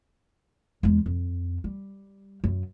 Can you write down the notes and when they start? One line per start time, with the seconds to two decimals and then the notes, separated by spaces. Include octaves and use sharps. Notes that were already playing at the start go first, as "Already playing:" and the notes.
0.83 E2 G#3
1.06 F2
1.64 G3
2.44 F#2